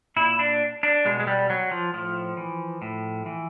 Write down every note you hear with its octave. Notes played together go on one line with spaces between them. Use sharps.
A#2 E4
D4
D4
B2 G#3
G#3
G3
F#3
F3
A2 F3
E3
A2
E3